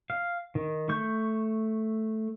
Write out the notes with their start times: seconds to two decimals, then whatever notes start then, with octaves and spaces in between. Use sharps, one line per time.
0.10 F5
0.55 D#3
0.89 A3 C#6 G6